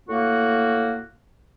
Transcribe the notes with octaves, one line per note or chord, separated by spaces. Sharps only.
A2 A#3 F#4